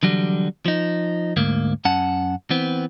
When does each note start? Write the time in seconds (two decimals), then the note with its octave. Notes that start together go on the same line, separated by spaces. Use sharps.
0.03 D3 E3 F#3 G3
0.66 F3 D#4
1.37 D2 G#2 A#3
1.85 F#2 C#4 F#5 A5
2.50 E3 B3 C4